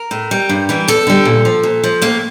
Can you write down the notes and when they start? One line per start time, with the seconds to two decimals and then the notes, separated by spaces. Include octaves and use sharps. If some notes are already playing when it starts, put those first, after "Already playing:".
Already playing: A#4
0.11 A2
0.31 G3
0.49 G2
0.69 E3 G3
0.88 E2 A4
1.07 D3 G3
1.25 A#2
1.45 F3
1.63 A#2
1.84 F3
2.02 A2 A#3